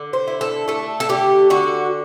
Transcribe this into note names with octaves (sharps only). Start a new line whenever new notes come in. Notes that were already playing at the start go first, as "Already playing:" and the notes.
Already playing: D3
C5
E4
A4
A3 A4
A4
D3 G4
D3 F#4